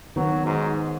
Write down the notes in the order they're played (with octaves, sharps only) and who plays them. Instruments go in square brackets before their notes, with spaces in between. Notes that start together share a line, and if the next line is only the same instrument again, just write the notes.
[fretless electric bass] D#3 B3 [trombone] F#3
[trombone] G#2